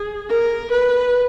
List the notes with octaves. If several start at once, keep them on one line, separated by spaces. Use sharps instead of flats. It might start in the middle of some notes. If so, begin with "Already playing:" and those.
Already playing: G#4
A#4
B4